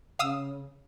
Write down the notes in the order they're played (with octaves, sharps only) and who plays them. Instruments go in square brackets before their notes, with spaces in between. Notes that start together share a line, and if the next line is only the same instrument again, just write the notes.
[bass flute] C#3 [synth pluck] F5 D#6 E6